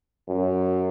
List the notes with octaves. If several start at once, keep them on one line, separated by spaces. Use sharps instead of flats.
F#2